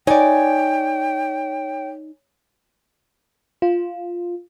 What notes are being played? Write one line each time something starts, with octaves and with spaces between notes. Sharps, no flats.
D#4 C#5 D5 G5 G#5
F4